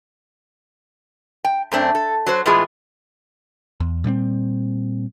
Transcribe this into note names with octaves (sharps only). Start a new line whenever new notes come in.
G5
F#2 A3 C4 D4
A4
F#3 F#4 C5
A2 E3 G#3 B3 F4 G#4
E2
A#2 G3 B3 C4